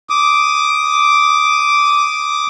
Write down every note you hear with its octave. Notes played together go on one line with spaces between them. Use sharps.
D6 D#6